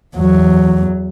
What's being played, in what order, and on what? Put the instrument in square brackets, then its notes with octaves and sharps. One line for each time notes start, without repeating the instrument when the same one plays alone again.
[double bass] E2 F#3